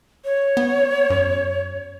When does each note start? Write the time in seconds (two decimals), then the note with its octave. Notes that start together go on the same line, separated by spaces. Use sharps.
0.25 C#5
0.57 B3
1.10 F#2